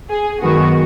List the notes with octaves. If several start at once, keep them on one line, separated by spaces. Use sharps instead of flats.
G#4
F#2 D#3 G#3 B3 F#4